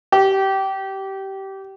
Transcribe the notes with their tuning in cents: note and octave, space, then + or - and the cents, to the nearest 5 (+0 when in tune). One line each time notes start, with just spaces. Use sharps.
G4 -20